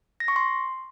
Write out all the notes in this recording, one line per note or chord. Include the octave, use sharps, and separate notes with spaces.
A#6
C#6
C6